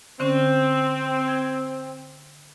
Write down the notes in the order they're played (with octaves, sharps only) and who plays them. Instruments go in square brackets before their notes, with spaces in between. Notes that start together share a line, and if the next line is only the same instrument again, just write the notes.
[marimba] D3 C#4 [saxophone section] C4
[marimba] G#6